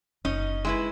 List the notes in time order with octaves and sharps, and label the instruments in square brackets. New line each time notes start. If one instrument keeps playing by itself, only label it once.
[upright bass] F#1 [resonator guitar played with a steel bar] C#4 D#4 D#5
[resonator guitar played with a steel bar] G#3 E4 B4